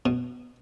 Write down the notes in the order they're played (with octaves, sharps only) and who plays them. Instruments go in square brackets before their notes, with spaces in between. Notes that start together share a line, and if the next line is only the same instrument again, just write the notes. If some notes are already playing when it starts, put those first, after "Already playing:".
[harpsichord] B2